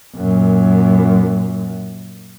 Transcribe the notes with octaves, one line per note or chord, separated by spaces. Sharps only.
F#2 A#2